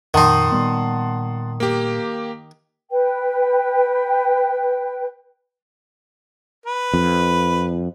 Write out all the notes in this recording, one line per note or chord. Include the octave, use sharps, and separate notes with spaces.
F2 A#2 D#3 D#4 F#5 A5 C6
A#2 G3 B3
A#3 G4
B4 G5
B4
F2